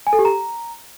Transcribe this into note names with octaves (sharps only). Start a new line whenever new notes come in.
G#5
A4
G4
A#5